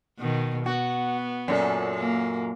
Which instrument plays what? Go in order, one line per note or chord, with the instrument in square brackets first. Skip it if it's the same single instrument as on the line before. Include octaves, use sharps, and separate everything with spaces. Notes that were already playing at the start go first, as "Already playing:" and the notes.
[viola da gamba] B2 D#3
[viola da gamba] B3 [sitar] F#4
[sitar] F#2 A#2 A4
[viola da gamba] A#3